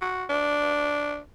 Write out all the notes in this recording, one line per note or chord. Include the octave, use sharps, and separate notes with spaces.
F#4
D4